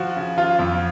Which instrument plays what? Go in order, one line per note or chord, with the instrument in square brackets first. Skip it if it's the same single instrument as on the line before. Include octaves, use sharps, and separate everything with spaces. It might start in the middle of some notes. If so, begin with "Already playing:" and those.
Already playing: [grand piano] F3 F#4
C#3
F3 F4
F2